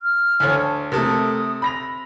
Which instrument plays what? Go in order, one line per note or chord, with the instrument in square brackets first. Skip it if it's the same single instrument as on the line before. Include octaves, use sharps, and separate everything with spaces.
[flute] F6
[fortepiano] D2 A4 C#5 [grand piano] G#5
[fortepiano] C3 A4 [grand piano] A3 A#4 [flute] D#6
[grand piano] B5 A#6 F7